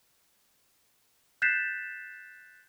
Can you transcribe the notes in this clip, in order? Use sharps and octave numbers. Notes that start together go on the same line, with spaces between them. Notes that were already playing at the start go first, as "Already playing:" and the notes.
F#6 G6 A6 B6 C7 E7